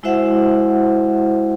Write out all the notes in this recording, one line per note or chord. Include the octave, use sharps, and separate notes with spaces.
G#3 E4 F#4 C5 E5 F#5